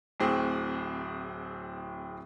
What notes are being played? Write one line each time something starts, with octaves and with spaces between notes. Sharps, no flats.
D1 A2 C4 G#4